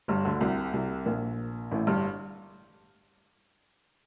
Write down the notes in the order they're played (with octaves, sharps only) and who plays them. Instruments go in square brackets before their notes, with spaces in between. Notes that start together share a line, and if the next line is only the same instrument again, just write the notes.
[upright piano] G1 G2
D2 D3
C2 C3
C2 C3
A#1 A#2
A1 A2
G1 G2